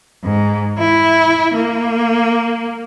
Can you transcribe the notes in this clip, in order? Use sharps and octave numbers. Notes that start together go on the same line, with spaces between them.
G#2
E4
A#3